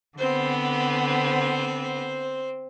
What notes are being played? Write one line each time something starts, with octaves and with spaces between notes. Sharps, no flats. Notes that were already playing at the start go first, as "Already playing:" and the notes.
D3 B3 C4 C5